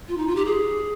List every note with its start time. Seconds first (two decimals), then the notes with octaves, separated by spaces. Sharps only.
0.08 F4
0.17 D#4
0.27 F4
0.36 G4
0.45 G#4